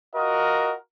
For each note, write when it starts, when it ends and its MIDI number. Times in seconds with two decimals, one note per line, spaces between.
0.15 0.73 65
0.15 0.73 66
0.15 0.73 70
0.15 0.73 75